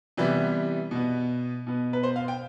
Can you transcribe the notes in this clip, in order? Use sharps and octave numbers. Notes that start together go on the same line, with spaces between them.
C3 E3 G3 B3
B2 B3
B2 B3
B4
C5
F5
G5